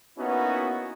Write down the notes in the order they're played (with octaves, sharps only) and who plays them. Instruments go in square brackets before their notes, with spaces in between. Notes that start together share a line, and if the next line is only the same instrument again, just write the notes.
[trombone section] A#3 B3 C#4 D#4 E4 F#4